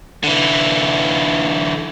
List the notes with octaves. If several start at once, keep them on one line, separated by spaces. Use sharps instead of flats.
D3 E3